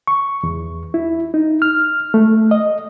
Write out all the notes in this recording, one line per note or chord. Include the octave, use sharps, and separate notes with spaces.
C#6
E2
E4
D#4
F6
A3
D#5